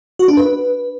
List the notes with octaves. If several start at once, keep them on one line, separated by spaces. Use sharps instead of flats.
F#4
D4
B4